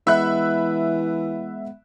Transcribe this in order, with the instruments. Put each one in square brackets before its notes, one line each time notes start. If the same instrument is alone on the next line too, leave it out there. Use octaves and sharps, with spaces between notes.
[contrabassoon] E3 [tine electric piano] G#3 B3 F#5 [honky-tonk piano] E5 B5 F#6